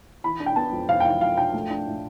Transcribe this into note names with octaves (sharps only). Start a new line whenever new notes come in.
E3 B5
D4
G5
B3 A5
F2
F2 F5
G5
E3 F5
F2 F5
D4 G5
A3
D4
A2